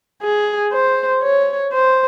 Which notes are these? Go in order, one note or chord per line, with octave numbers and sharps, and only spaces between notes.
G#4
C5
C#5
C5